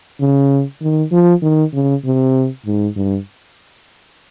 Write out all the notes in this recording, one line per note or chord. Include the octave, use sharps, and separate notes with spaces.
C#3
D#3
F3
D#3
C#3
C3
G#2
G2